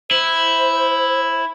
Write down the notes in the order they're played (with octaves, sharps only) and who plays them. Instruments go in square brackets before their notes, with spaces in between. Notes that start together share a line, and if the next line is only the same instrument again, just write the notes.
[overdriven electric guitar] E4 [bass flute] C5